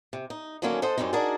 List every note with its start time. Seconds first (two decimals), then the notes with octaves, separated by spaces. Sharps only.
0.13 C3
0.30 D#4
0.62 D3 D#3 F#3 A#3 C#4
0.82 A4 C5 D#5 F#5
0.98 F#2 G3 C4 C#4 D#4
1.13 D4 D#4 F#4 G#4 A#4 D5